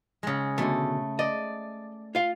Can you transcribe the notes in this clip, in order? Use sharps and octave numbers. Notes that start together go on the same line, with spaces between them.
C#3 G#3
B2 D3 A3
D5 D#5
F4 F5